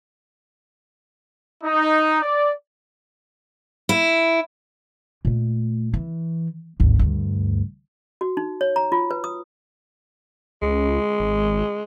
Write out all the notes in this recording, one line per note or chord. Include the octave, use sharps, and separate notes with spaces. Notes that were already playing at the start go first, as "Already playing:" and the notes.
D#4
D5
E4
A#2 A3
E3
G#1 D2
D2 G2
F#4
D#4
C#5
A#5
F4
B4
D#6
C#2 G#3
G#1